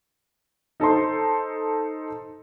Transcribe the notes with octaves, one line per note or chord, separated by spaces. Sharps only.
D#4 A4 C5 C6